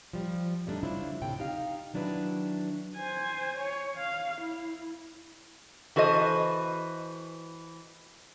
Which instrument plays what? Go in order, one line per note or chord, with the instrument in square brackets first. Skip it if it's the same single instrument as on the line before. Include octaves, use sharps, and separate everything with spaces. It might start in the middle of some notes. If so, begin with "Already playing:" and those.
[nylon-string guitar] F3 G3
F2 G3 A3 A#3 D4 D#4
C#3 G3 D4 E4 F4 C5
D2 A2 C3 G5
D#4 G4 F5
D#3 F#3 D4 E4 B4
[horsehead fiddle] C5 G#5
C#5
F5
E4
[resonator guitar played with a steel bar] E3 F#4 A4 C5 D#5